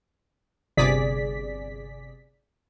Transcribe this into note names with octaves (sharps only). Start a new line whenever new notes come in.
G1 C3 G#4 D5 B6